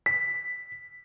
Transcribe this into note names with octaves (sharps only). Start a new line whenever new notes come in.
B6